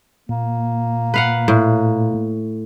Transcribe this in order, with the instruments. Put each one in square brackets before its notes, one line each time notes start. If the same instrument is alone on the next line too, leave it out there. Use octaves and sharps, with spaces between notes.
[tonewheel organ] A#2 [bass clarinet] A#3
[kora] B4 F5 F#5
A2